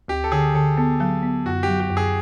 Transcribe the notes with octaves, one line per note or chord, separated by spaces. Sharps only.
D2 G4
A4
D3 G#4
D3 A4
B3 A4
F#3 A4
B3
F#2 F#4
G4
F#3
G4
F#2
G#4